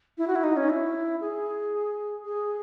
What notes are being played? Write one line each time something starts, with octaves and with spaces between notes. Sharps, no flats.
E4
F#4
E4
D#4
C#4
E4
G#4
G#4